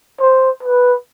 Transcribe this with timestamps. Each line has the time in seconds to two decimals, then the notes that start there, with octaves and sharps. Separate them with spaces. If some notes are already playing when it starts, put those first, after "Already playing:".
0.20 C5
0.63 B4